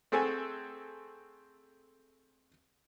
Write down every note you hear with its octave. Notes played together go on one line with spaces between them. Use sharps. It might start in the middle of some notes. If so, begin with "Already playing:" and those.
A3 C4 G#4 A4 F#5 G#5